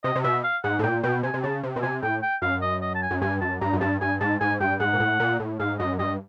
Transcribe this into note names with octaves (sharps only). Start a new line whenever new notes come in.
C3 D#5
C3
B2 E5
F5
G#2 F#5
A2
A#2 G5
B2 G5
C3 G#5
C3
C#3 A5
C3
B2
C3 G#5
A2 G5
G5
F#2 F5
D#5
D#5
A5
G#5
F#2
G2 G#5
F#2 A5
G2 A#5
F#2
G2 A5
G2 G#5
G#2 A5
G#2 G#5
G2 G5
G#2 F#5
A#2
A2
A#2
A2
G#2 F5
F#2 D#5
G2 D#5